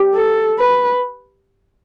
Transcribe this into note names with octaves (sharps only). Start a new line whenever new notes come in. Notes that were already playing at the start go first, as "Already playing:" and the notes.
Already playing: G4
A4
B4